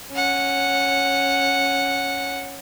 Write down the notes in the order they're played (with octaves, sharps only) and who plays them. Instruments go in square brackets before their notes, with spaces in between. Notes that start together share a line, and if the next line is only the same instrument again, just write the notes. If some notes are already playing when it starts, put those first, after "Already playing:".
[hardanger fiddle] C#4 F#5